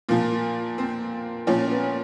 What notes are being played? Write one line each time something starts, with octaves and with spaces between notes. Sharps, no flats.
A#2 F3 A#3
C4
A#2 F3 C#4
B3